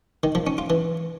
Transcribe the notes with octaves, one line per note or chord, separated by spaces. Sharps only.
D#3
F3
C#4
F4
E3